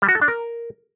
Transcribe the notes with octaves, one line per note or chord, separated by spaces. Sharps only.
G3
F#4
A4
D4
A#4